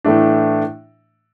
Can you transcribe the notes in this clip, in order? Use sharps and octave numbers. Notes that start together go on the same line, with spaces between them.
A2 E3 A3 D4